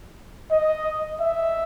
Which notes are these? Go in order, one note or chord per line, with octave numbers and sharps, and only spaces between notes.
D#5
E5